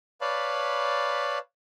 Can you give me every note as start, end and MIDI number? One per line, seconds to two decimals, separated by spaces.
0.21 1.38 71
0.21 1.38 73
0.21 1.38 74
0.21 1.38 77
0.21 1.38 81
0.21 1.38 83